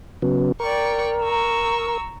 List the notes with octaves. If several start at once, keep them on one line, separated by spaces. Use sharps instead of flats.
C#3 F#3 B3
A#4 D5 G5 C#6
A#5 C#6 E6